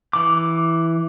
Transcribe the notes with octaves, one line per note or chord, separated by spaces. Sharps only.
E3 D6